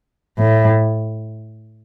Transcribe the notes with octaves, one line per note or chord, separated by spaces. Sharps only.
A2